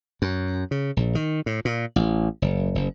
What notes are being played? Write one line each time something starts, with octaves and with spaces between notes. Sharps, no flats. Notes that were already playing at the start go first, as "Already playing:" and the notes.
F#2
C#3
A#1
D#3
A2
A#2
A1
F#1
F#1